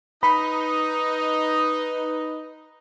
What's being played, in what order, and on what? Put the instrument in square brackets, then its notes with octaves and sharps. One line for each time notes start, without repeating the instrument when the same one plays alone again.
[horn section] D#4 [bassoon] B4 [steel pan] B5